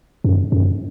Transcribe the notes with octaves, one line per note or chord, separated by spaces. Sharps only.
F#2
F#2